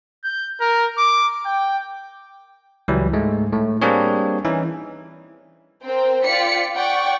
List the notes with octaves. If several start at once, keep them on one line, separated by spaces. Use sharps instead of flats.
G6
A#4
D6
G5
C#2 E3 F#3 G3
G#2 G#3 A3
A2 A3
G3 A#3 C4 D4 G#4 C#5
E3 C#4 D#4
C4 A#4 C5 G5
F4 D5 G5 B6 C#7
D5 F#5 G5 C#6